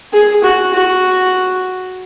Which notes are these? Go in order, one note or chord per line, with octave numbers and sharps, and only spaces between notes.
G#4
F#4
F#4